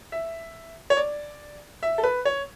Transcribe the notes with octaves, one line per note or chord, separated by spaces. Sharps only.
E5
C#5
D5
E5
A4
B4
C#5